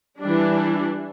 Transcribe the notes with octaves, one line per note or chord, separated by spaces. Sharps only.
E3 G3 D4